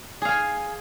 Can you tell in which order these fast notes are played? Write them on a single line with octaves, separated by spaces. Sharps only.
G#4 F5 G#5